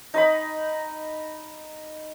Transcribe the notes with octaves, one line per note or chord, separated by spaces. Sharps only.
D#4 D#5 B5